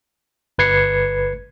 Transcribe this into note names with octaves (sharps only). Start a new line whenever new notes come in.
G1 B4 G#6 C7 C#7